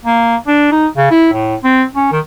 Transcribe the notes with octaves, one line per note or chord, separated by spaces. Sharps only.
A#3
D4
D#4
C#3
E4
A2
C4
C#4
D#3